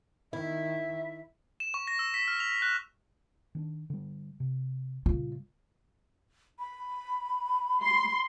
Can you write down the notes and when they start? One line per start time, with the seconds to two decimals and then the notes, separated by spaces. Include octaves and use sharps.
0.33 D#3 E4 E5
1.60 E7
1.74 C#6
1.87 A#6
1.99 E6
2.14 B6
2.28 F6
2.40 F7
2.62 F#6
3.55 D#3 C#4 D4
3.90 D3 G3
4.40 C3
5.06 A#2 C#3 G3 F4
6.59 B5
7.82 C6